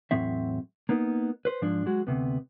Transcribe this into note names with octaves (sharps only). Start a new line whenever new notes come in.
E2 A2 F#3 C4 E5
A#3 B3 D#4
B4 C5
G#2 F3 G#3 D4
F#3 G#3 F#4
D2 C3 B3